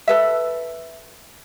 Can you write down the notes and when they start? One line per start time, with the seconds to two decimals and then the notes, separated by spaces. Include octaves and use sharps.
0.08 A4 B4 E5